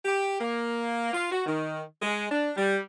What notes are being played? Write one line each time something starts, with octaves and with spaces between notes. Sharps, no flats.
G4
A#3
F4
F#4
D#3
G#3
D4
G3